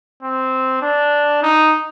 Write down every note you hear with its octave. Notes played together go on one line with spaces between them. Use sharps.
C4
D4
D#4